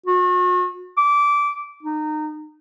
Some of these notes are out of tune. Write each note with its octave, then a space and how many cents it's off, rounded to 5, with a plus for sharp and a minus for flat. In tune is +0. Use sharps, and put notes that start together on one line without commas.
F#4 -40
D6 -15
D#4 -25